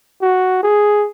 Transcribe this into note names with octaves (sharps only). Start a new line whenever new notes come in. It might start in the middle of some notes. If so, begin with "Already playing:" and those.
F#4
G#4